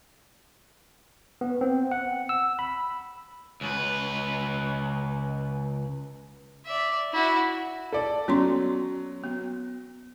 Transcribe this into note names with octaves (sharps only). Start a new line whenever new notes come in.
B3
C4
F#5
E6
B5
C#2 B4
D5 E5
E4 F#4
A4 D5
F#3 B3 C#4 C6
B3